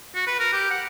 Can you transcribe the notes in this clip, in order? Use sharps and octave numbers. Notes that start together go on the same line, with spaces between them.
F#4
B4
A#4
G4
F#5